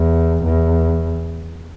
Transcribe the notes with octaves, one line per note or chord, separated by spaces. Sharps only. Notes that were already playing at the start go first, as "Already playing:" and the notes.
Already playing: E2
E2